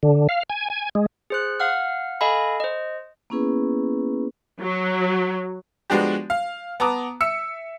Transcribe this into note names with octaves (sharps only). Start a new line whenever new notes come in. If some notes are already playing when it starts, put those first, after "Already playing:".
D3
F5
G#5
G#5
G#3
G#4 C5 F#6
F5 F#5 F6
A4 D#5 F5 G#5 B5
C5 D#5
A#3 B3 C#4 E4 G#4 B4
F#3
F3 G#3 B3 D4 F#4 G4
F5
B3 A5 A#5 D6 D#6
E5 E6 C#7